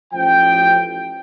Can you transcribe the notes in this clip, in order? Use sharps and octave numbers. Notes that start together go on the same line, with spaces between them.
A1 F3 G5